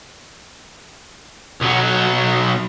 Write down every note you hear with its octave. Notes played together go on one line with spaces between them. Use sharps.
B1 F#3